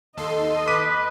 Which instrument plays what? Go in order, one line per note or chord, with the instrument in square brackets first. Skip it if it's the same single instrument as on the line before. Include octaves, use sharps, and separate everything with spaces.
[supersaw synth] D#2 A4 C6 [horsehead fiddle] D#5
[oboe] B4 [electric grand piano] D6 B6 D#7